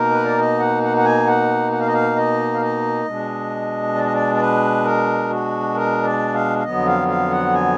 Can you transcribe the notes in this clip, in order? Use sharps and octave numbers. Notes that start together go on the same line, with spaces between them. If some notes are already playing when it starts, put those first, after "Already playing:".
Already playing: B2 A#3 D#4 A#4
B4
D5
D#5
F#5
F#5
F#5
G#5
F#5
F#5
F5
D#5
F5
D#5
F5
D#5
B2 G#3 D4
D5
D#5
D5
D5
B4
A#4
F#4
A#4
D5
F5
F5
F2 D3 F#3 B3 D#5
F5
F5
F#5
G#5